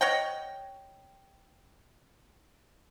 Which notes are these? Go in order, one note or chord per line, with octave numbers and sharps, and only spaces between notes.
C#5 D#5 F#5 G5